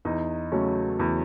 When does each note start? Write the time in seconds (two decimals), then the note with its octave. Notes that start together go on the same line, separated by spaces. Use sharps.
0.05 E2 D#4
0.52 C#3 F#3 A3 C#4
0.99 E2